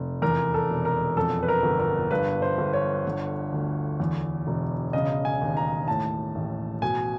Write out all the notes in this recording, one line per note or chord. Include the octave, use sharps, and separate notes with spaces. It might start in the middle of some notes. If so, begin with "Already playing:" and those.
Already playing: F1
E2 A#4
A4
E1
A#4
F2 A4
B4
A#4
G1
A#4
G2 B4
C5
G1
C#5
D3
D2
E2
E1
C#3 D#5
G#5
D#2
A#5
A2 A5
A1
B2 G#5